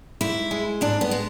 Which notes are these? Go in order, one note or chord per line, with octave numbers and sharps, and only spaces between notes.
G#2 E4
G#3
G#2 D4
B3
G#3